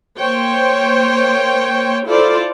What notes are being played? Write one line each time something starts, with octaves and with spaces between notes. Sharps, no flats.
A#3 C5 C#5 G5
E4 F4 A4 C5 D5